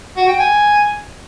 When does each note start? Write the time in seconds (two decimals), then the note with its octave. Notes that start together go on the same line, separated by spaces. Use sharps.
0.17 F#4
0.28 G5
0.40 G#5